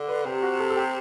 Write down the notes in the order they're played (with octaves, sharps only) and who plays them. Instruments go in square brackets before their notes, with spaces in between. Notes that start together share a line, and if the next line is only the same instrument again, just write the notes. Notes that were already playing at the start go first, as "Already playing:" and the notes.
Already playing: [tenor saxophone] D3
[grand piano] B4
[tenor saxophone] C3 [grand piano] G4
[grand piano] F#4
A4
A4
G4